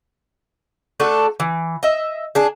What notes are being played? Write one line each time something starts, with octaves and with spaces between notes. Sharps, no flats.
A3 D4 F#4 A4
E3
D#5 E5
D4 G#4